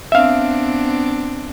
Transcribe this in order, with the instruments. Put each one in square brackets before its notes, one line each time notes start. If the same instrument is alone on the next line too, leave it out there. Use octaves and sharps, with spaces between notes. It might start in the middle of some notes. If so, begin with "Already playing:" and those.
[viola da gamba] B3 C4 D4 [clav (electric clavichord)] E5 F5